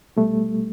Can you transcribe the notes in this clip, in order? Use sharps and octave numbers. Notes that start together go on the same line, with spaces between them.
C2 B2 G3 A3